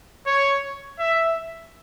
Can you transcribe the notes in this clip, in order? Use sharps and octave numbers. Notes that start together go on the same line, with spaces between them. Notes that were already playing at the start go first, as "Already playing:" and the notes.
C#5
E5